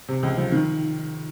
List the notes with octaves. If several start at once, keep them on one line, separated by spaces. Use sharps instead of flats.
C3
C#2
F3
D#3